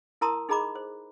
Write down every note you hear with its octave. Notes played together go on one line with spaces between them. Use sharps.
E4 A#4 A5 A#5 C6 D#6
D#4 G#4 D#5 A#5 B5 D6
C5